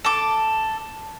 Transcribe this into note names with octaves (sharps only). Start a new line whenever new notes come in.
A4 D6